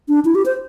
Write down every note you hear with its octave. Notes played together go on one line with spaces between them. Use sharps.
D4
E4
G4
C5